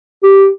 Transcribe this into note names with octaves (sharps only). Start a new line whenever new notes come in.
G4